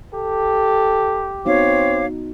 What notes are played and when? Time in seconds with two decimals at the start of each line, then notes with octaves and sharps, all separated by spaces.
0.14 G4 A4
1.46 B3 C4 D#4 F#4 C#5 F5 D6